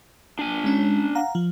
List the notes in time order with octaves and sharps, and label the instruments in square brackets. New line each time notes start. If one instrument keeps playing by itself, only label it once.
[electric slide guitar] D4 G#5
[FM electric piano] G#3 C#4
F5 F#5 A#5
F3